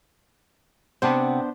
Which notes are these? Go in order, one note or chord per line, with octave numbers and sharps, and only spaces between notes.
C3 B3 D4 C5 F#5